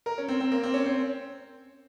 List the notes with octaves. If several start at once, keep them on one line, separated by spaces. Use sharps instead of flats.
A#4
C#4
C4
C4
A#3
C4
C#4
C4